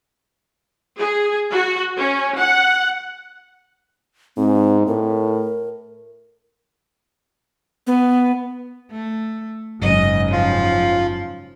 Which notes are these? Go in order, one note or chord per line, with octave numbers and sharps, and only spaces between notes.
G#4
F#4
C#4
F#5
G#2 C4
A2 A#4
B3
A3
F#1 G#2 C#3 F#3 D#5
F3 F4